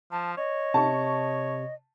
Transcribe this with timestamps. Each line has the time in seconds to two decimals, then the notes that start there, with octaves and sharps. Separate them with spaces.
0.12 F3 A5
0.37 C#5 D#5
0.74 C3 A5 C#6